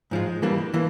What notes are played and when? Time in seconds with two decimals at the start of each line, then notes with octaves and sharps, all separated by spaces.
0.11 G#2 F3 G#3
0.42 E3 G3 A#3 D4
0.74 E3 A#3